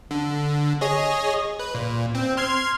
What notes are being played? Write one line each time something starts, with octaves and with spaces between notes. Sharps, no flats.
D3
G#4 C#5 D#5
B4
A#2
C4
C6 F6 G#6